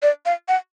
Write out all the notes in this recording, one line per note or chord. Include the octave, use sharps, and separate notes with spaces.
D5
F5
F#5